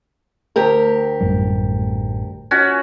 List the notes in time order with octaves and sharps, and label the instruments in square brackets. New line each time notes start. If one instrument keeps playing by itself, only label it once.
[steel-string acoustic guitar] D2 G4 A#4
[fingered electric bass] A1 F#2 G3
[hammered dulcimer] C#4 F#4